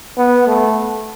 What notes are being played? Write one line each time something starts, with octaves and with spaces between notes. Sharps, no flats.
B3
A3